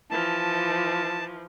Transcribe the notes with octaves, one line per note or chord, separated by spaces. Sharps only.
E3 F3 A5